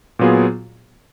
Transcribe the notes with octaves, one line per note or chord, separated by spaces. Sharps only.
A#2 F#3 B3 F4 G#4